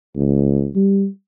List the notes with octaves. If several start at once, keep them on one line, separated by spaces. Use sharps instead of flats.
C#2
G3